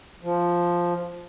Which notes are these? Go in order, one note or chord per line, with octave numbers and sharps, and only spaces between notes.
F3